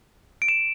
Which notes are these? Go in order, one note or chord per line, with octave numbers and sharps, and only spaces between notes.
D7
E7